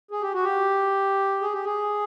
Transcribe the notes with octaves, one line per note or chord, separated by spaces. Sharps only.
G#4
G4
F#4
G4
G#4
G4
G#4